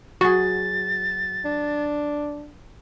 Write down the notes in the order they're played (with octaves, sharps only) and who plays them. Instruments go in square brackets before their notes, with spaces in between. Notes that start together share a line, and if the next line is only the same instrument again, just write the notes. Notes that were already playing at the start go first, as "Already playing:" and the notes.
[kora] F#3 G#4 [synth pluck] F#4 [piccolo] A6
[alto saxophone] D4